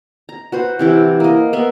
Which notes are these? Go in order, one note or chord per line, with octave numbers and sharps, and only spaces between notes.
A#5
F#4 B4 C5
C3 E3 E4
A#3 D#5
B3 A#4 E5 C6